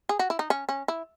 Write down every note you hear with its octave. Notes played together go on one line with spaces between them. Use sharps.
G#4
F#4
E4
D#4
C#4
C#4
E4